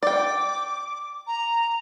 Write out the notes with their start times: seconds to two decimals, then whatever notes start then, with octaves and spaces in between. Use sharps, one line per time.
0.03 D5 G5 D6
1.27 A#5